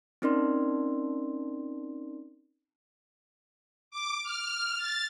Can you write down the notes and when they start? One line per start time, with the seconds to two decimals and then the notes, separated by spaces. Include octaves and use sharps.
0.22 C4 C#4 D#4 A#4 D5 C6
3.91 D6
4.23 F6
4.77 A6